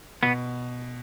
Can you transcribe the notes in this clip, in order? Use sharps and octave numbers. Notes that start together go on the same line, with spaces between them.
B2 B3